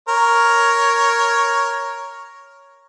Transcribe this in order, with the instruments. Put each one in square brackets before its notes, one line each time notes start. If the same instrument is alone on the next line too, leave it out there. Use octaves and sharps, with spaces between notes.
[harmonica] A#4 C#5